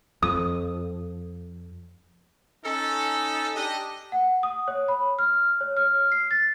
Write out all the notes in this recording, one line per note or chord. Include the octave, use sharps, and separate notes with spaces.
F2 D#6
C#4 D#4 A4
D4 G4 D#5
F#5
D#6
C#5
B5
F6
C#5
F6
C7
A6